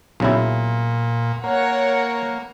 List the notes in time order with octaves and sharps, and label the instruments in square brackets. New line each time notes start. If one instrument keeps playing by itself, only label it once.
[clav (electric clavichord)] B1 C#3 E4 [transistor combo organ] A#2
[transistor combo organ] A#3 [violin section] A#4 C#5 F#5